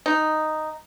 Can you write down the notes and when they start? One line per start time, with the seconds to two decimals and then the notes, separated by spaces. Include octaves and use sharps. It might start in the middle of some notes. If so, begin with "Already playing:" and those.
0.06 D#4